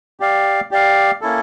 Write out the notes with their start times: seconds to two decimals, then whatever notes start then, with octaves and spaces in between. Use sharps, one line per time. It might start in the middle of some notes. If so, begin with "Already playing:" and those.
0.20 G4 D5 F5
0.71 G4 D5 F5
1.21 A#3 C#4 E4 A4